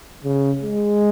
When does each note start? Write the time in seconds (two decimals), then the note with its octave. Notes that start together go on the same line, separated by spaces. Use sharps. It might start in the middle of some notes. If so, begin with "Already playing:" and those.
0.24 C#3
0.63 G#3